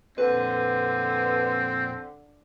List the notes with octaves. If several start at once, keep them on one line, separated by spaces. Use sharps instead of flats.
F2 A#2 D3 C4 B4